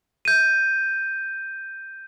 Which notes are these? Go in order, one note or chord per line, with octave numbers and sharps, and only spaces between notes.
G6 D#7